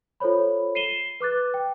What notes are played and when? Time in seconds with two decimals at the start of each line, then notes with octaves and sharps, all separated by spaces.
0.20 F4 A4 C5 C#5 B5
0.75 C7 D#7 E7 G7
1.20 B4 D6 F#6 A6
1.54 G5